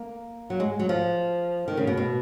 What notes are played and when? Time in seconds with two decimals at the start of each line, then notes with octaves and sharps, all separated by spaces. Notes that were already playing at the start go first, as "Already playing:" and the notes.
Already playing: A#3
0.50 F#3
0.60 G#3
0.79 F#3
0.89 F3
1.68 D#3
1.77 C#3
1.87 B2
1.97 B2